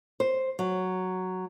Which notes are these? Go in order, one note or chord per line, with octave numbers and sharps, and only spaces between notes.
C5
F#3